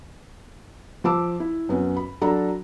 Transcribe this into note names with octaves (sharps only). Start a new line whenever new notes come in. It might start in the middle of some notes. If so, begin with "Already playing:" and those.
F3 F4 A5 D6 E6
E4
F#2 B3 C#4
B5
F#3 D4 A4 A#5 B5